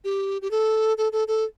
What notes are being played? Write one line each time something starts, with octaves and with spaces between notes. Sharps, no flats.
G4
G4
A4
A4
A4
A4